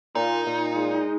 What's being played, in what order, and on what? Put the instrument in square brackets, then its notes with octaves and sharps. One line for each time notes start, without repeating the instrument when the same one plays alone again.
[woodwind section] A#2 [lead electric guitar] D#4
[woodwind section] A#2
G#3